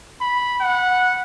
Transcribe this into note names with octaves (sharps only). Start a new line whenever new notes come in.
B5
F#5